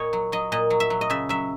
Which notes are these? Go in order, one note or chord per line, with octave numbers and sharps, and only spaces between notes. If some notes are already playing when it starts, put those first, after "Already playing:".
Already playing: A#2 C#5 D#5
F#3
F#3 D#5
A#2 D#5
F#3
E5
F#3
D#5
C#3 E5
F#3 E5